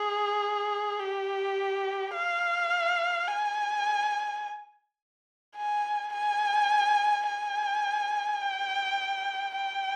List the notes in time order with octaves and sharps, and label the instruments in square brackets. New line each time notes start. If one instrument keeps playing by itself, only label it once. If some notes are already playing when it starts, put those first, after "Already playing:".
Already playing: [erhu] G#4
G4
F5
G#5
G#5
G#5
G#5
G5
G5